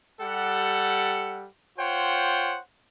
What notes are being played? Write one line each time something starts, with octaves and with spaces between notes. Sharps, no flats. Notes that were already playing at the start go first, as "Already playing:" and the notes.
G3 G4 A4 F#5
F4 C5 C#5 F#5 G5